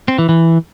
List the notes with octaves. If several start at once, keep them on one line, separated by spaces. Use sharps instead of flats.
C4
E3
E3